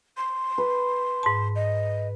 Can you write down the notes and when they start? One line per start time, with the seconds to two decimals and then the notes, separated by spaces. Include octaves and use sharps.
0.17 C6
0.58 B4
1.23 G#2 A5
1.55 D#5